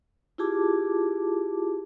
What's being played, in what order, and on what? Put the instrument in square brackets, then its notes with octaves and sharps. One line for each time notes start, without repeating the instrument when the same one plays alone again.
[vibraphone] E4 F4 G4 G#4 A5 D6